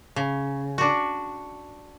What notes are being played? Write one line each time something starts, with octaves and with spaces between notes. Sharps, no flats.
C#3
D4 F#4